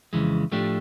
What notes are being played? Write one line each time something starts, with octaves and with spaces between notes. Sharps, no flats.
F2 C#3 E3 G#3
A2 F3 A3 D4 G4